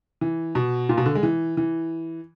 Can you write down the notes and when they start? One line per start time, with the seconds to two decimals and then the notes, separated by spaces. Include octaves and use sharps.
0.21 E3
0.55 B2
0.89 A#2
0.98 B2
1.06 D3
1.15 G#3
1.23 E3
1.57 E3